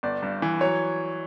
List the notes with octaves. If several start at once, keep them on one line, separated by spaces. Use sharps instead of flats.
G1 D5
G2
E3
F#3 C#5